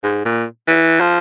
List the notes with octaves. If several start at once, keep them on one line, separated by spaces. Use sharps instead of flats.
G#2
A#2
E3
F3